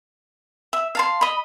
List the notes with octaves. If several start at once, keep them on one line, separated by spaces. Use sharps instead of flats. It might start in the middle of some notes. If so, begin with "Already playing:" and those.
E5
F5 A5 C6
D#5 B5